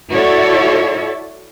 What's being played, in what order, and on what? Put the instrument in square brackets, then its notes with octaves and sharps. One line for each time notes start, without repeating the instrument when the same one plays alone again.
[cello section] E4 F#4 A4 C#5 D5 E5